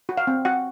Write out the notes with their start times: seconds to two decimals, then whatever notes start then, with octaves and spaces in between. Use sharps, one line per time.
0.09 F#4
0.17 F5
0.27 C4
0.45 F#4 F#5